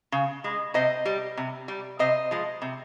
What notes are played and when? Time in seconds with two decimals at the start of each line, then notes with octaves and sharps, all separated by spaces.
0.12 C#3
0.44 G#3
0.74 C3 C5 D#5
1.05 G3
1.37 C3
1.68 G3
1.99 C3 C5 D#5
2.31 F3 G#3
2.62 C3